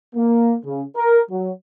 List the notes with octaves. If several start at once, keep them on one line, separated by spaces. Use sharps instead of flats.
A#3
C#3
A#4
F#3